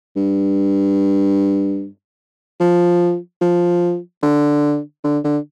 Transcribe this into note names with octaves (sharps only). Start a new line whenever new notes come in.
G2
F3
F3
D3
D3
D3